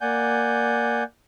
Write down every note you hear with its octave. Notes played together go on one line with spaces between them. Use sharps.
A#3 D5 F#5 G#5 G6